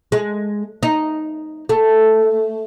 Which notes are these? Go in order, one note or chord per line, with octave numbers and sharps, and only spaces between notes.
G#3
D#4
A3